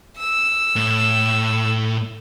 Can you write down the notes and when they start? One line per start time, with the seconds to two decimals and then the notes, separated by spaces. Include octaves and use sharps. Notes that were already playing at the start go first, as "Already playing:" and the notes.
0.17 E6
0.76 A2